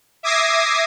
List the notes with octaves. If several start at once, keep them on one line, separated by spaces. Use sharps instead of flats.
E5 D6 D#6 G#6 A#6 C7